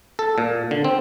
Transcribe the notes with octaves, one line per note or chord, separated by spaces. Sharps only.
A4
A#2
D3
C4